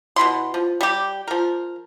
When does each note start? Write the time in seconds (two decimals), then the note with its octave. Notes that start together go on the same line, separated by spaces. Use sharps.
0.16 B2 G3 E4 C6
0.54 F3
0.81 G3 G4
1.28 F3 A#4